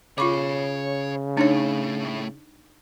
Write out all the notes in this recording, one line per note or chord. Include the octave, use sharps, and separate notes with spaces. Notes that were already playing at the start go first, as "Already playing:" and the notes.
C#3 F4 C#5 B5 C#6 D6
A2 A3 D4 D#4 C#5